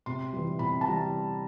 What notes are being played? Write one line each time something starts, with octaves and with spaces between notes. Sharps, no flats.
C3 C6
E3 G3
C3 B5
A5
E3 G3 A#5